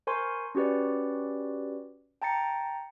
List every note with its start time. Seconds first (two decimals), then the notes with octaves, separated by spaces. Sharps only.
0.07 A#4 C5 G#5 C6 C#6
0.55 C#4 F#4 G4 B4 D5
2.22 G5 A5 A#5 A6 C#7